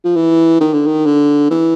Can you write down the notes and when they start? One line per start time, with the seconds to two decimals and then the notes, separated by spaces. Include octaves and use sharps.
0.04 F3
0.16 E3
0.60 D#3
0.74 D3
0.86 D#3
1.06 D3
1.51 E3